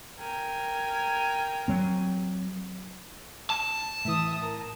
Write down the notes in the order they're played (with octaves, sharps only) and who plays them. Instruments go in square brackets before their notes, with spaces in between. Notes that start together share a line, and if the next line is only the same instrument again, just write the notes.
[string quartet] A#4 G5 G#5
[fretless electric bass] F#3 C4
[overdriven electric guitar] A5
[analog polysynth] A2 E3 [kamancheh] E5 D#6
[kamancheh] A#4